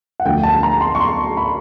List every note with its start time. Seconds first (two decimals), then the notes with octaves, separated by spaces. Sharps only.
0.20 F#5
0.26 D2 D3 F3 G5
0.43 A5
0.63 A#5
0.81 C6
0.95 C#6
1.00 C6
1.37 B5